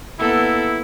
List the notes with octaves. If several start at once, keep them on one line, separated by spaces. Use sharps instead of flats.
A#3 B3 E4 A4